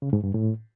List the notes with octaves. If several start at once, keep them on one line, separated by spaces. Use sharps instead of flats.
C#3
G#2
G2
A2